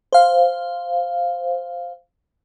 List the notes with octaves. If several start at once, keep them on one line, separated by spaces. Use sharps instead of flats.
C5 F5